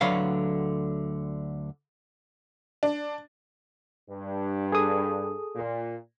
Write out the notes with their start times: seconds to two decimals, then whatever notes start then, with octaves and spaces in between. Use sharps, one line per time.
0.01 D2 D3 F#3 B4 C#5 F5
2.83 D4
4.09 G2
4.72 G#4 A4 D#6
5.56 A#2